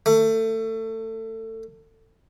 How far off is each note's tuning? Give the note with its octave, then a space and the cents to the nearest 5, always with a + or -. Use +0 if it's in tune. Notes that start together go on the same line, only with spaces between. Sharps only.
A3 +25